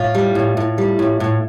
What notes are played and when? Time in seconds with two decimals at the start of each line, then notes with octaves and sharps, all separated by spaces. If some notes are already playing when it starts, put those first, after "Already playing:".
Already playing: A2 F4
0.15 G3
0.35 A2
0.57 A2
0.78 G3
0.99 A2
1.20 A2